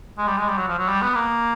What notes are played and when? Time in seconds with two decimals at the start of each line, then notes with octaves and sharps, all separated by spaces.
0.18 G#3
0.28 G3
0.38 G#3
0.48 G3
0.58 F#3
0.68 F3
0.78 F#3
0.88 G3
1.02 B3
1.15 A#3